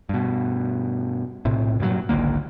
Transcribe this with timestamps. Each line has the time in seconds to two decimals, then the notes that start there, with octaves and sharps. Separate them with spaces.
0.09 G2 B2
1.45 B1 A2 C3
1.80 G2 A#2 D#3 F#3
2.09 G#1 C#2 D3 A#3